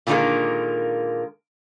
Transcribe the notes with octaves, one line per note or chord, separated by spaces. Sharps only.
A#2 D3 D#3 G3 G#3 A#3